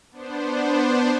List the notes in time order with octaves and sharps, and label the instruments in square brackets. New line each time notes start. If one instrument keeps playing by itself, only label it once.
[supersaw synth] B3 D4 C5